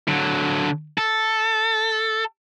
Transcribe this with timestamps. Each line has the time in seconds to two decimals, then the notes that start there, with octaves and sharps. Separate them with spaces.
0.08 D3 F#3
0.98 A4